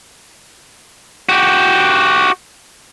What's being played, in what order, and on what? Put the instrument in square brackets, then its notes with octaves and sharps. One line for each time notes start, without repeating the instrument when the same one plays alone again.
[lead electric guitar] F#4 G4